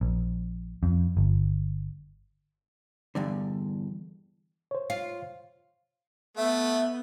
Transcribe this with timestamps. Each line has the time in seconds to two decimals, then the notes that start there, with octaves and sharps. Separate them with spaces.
0.01 A#1
0.83 F2
1.17 G1
3.15 E2 G2 D3
4.71 C5 C#5
4.90 F4
6.37 A3 B3 E5